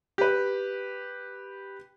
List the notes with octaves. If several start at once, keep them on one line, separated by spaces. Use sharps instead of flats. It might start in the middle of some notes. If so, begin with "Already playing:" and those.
G4 B4